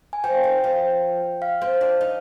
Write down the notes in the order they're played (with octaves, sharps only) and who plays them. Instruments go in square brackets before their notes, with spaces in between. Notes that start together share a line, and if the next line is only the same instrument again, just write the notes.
[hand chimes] G#5
[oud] F3 [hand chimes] G5
[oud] D#3
F3
[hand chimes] F5
[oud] C4
D4
D#4